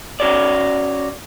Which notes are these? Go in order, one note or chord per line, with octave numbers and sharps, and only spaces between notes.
C#4 F#4 C#5 D5